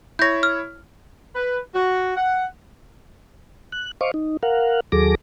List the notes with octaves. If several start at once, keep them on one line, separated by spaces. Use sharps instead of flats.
E4 C#5 G6 A#6
F6
B4
F#4
F#5
F#6
C5 D#5 F5 C#6 D6
D#4
A#4 F5 F#5
D#2 F#3 G#4 A4 D6 A#6